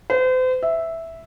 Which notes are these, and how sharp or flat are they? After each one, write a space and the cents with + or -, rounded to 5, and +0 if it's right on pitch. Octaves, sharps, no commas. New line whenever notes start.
C5 -40
E5 -5